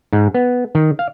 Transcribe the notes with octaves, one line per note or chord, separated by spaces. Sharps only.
G#2
B3
D#3
F5